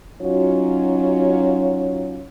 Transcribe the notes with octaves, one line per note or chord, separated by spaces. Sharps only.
F#3 C#4 D#4 F4 F#4 C#5